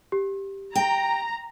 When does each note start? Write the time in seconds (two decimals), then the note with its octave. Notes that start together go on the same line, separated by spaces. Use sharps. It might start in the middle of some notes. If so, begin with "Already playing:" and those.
0.12 G4
0.75 G5 A#5